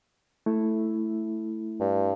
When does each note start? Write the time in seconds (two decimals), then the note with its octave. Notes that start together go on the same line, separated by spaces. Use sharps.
0.46 A3 E4
1.80 G2